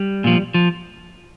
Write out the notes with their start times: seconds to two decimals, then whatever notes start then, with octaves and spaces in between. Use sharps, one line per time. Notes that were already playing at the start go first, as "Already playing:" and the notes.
Already playing: G3
0.24 A#2 F3
0.54 F3